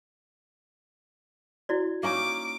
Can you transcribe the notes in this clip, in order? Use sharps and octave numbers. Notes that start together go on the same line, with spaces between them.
E4 F#4 D5
A#3 C#4 D#4 D6